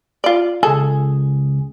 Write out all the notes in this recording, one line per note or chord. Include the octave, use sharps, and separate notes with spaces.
F4 D5
C#2 G#4 A4